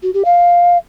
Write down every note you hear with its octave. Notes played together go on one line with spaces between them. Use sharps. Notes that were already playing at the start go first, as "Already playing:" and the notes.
F#4
G4
F5